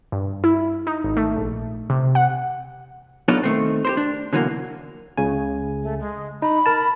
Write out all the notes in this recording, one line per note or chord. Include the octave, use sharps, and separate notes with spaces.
G2
E4
D#4
G#1
A3
A#1
C3
F#5
F#3 B3 D4 D#4 F4 A4
D#3 A3 C4
G4 A#4 C5
D4
B2 D3 E3 F#3 A#3
C#2 C#3 G#5
A3
G#3
D#4 B5
A#4 A5